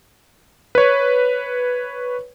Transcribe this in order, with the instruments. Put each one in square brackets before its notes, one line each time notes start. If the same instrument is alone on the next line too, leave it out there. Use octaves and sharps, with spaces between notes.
[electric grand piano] B4 C#5